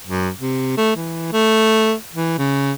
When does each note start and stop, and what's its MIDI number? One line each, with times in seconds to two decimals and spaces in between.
0.07 0.29 42
0.39 0.75 48
0.77 0.96 57
0.96 1.29 52
1.32 1.93 57
2.13 2.34 52
2.38 2.72 49